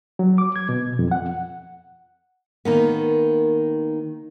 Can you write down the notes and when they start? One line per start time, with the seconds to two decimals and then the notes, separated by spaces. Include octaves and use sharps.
0.19 F#3
0.38 D6
0.56 G#6
0.69 B2
0.99 F2
1.11 F#5
2.65 D#3 A#3 B3